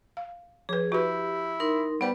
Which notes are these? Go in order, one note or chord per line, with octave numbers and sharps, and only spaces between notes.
F5
F3 G#4 B4
E4 F#4 G4 B4
D#4 A#4 C6
G3 B3 B4 C5 F#5